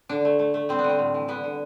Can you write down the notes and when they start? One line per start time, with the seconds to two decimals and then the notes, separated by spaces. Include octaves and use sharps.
0.09 D3 D4
0.25 A3
0.39 A3
0.54 A3
0.69 G3 C4
0.79 B3
0.84 D3
0.89 C4
0.99 A2
1.14 E3
1.28 D3 B3
1.44 D3